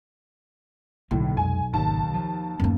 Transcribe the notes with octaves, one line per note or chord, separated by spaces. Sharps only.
B1 A2 D3 A3 A#3
F2 C3 G#3 G#5
G#1 D#2 C#3 A5
F3
D1 F#2 A#3 B3